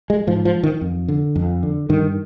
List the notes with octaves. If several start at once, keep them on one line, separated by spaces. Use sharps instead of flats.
G#3
G#2 F3
F3
D#3
F2
D3
F2
D3
G2 D#3